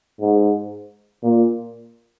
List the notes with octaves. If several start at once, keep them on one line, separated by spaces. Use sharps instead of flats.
G#2
A#2